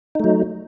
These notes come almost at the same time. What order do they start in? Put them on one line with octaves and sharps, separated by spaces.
D#4 A3 F#3